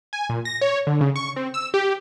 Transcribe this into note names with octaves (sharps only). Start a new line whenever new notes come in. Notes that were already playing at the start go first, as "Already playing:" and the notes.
G#5
A#2
A#6
C#5
D3
C#3
C#6
C4
E6
G4